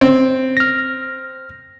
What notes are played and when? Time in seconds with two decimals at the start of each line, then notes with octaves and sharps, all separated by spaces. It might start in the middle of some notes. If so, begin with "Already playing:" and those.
0.01 C4
0.57 F6 A#6